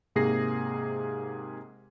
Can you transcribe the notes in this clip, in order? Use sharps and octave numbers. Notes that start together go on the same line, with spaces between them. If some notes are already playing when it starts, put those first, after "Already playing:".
G#2 C3 A#3 G#4 A#6 C7